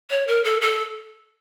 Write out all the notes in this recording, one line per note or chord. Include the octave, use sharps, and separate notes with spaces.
C#5
A#4
A4
A4